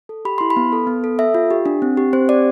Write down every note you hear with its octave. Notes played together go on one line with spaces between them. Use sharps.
A4
G4 B5
E4 C6
B5
B3
A4
B3
A4
A4 E5
F4
G4
D4
C4
G4
C4 C5
G4 D5